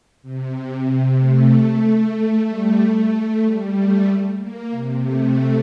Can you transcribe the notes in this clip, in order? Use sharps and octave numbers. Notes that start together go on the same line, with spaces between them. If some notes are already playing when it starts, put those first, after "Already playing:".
C3
A3
G3
A3
G3
A3
A#3
C3
A3